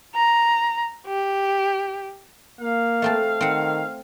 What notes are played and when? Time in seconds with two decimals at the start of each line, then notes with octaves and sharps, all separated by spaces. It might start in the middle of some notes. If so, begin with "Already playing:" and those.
0.15 A#5
1.07 G4
2.61 A#3 F5
3.02 A3 C4 A5
3.41 D#3 C4 F#5